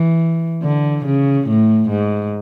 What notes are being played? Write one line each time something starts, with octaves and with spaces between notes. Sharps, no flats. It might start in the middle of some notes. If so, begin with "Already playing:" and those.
Already playing: E3
D3
C#3
A2
G#2